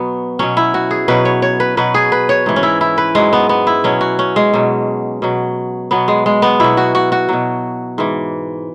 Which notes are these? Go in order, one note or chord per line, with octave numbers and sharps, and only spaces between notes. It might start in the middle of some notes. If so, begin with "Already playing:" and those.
Already playing: B2 F#3 B3
B2 F#3 C#4
E4
F#4
G#4
B2 F#3 B4
C#5
C#5
B4
B2 F#3 B4
G#4
B4
C#5
G#2 E3
C#4
E4
E4
B4
G#2 F#3 G#3
B3
B3
E4
B2 F#3 C#4
F#4
C#4
G#3
B2 F#3
B2 F#3
B2 F#3 B3
G#3
G#3
B3
B2 F#3 E4
F#4
F#4
F#4
B2 F#3
G#2 E3